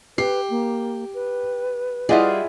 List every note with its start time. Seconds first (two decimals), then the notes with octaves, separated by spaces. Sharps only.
0.18 G4 B4 C7
0.50 A#3
1.14 B4
2.09 G3 E4 F4 G#4 D5 D#5 F#5